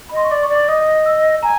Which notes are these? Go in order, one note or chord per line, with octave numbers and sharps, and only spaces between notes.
B5
D#5 C6
C#6
D5 D6
C#6
D5
D6
D#5 D#6
E6
G#5 A#5